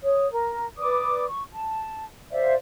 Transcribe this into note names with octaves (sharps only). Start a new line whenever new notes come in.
C#5 D#6
A#4
B4 D5 D6 D#6
C#6
A5
C5 D5 E5 F5